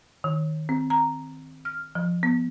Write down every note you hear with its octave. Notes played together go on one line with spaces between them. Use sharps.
D#3
C4
A#5
F6
F3
B3